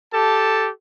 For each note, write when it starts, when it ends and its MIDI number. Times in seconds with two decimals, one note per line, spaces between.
0.14 0.70 67
0.14 0.70 69
0.14 0.70 81